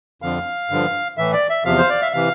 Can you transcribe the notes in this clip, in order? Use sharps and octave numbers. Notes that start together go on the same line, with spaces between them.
F2 D3 F3 F5
G2 D3 F3
A2 E3 E5
D5
E5
E2 C3 F3 F5
C5
D5
E5
C3 E3 F5